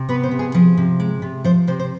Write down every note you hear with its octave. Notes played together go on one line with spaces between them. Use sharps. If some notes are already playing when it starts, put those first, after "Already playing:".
Already playing: C3
B3 B4
C5
C3
G#4
F3 G#4
C3
G#3
C3
F3 C5
C3 C5
C5